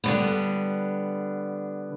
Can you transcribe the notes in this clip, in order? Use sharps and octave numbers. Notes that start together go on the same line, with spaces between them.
D3 G3 B3